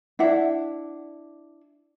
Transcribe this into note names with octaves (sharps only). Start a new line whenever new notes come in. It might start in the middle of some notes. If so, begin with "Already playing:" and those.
D4 E4 E5 F#5